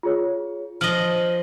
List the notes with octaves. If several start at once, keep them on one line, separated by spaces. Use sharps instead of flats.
F4 G#4 C#5
F3 D#5 F6 F#7 G7